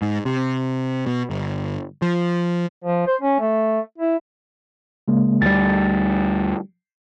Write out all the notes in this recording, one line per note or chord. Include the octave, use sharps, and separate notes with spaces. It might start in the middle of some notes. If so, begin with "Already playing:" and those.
G#2
C3
B2
G1
F3
F3
C5
C#4
A3
E4
C#3 G#3 A#3
D2 G3 A6